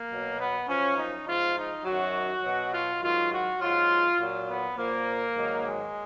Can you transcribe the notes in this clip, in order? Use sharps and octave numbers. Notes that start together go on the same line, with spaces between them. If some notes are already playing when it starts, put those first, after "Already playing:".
Already playing: A#3
B2 F#3
B3
F#2 F3 C#4
D#4
G#2 F3 F4
D#4
F#2 D#3 F#3 F#4
B2 F#3
F4
G#2 D#3 F#3 F4
F#4
G#2 F#3 F4
A#2 F#3
B3
A#2 F3 A#3
G#2 D#3 F#3
G#3